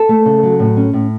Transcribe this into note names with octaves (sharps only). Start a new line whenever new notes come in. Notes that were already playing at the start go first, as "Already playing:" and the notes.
Already playing: A4
A3
C#3
F#3
A2
C#4
A2